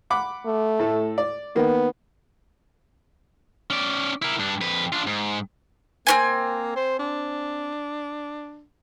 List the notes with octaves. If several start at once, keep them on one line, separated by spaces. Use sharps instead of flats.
F#5 B5 D6
A3
A2 A4
D5
D#3 A#3 B3
C#4 D5
E4 A#4
G2 D4
F2 B4
D4 F4
G#2
A#3 C4 C#4 G#5
C5
D4